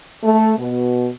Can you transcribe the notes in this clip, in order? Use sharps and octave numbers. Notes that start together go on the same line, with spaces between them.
A3
B2